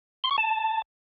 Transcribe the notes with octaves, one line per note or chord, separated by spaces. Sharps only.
C6
C#6
A5